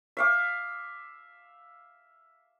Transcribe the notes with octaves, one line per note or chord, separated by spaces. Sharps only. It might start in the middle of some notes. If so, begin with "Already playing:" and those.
E5 F5 D6